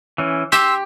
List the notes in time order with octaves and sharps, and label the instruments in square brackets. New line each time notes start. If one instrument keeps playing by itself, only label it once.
[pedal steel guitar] E3 C#4
[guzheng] G4 [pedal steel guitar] C6 [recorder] E6